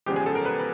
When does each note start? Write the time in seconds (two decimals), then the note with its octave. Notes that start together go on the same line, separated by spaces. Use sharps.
0.06 E2 C#3 F3 G#3 G4
0.16 G#4
0.26 A4
0.35 A#4
0.45 B4
0.59 B4